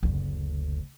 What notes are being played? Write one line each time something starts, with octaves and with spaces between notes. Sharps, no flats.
F#1 D2